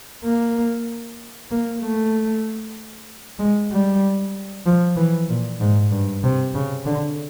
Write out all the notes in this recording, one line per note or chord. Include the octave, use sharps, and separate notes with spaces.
A#3
A#3
A3
G#3
G3
F3
E3
A#2
G#2
G2
C3
C#3
D3